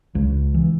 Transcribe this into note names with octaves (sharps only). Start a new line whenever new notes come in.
C#2
E3